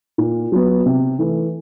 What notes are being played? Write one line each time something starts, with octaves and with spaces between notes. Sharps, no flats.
A#2
F#3 B3
C3
E3 A3